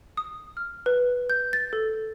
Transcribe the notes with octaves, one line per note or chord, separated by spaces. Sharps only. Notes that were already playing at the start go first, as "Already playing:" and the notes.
D#6
F6
B4
G6
A6
A4